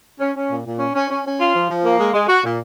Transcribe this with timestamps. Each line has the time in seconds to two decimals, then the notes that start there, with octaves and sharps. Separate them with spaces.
0.20 C#4
0.36 C#4
0.50 A#2
0.66 A#2
0.79 C#4
0.94 C#4
1.09 C#4
1.25 C#4
1.40 F4
1.54 F3
1.69 F3
1.84 A#3
1.98 G#3
2.14 G#3
2.28 F#4
2.44 A#2